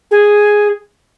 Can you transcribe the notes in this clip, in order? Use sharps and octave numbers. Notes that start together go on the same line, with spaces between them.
G#4